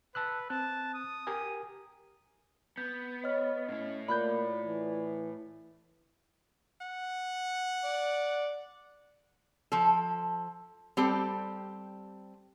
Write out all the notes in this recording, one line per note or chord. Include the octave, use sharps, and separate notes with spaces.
B4 A5 E6 F#6
C4 A5 F#6
D#6
G4 A#4 G#5
B3 G6
C#5 D#5 F6
A2 C#4 E4
A#3 F4 D5 B5 F#6 G6
E3
F#5
D5
F3 A4
G3 C4 G4 A4